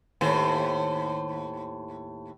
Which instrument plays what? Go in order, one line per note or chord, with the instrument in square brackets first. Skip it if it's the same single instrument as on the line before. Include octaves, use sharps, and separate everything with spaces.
[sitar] D#2 A2 C5